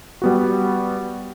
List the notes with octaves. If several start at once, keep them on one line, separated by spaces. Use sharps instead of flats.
G3 B3 F#4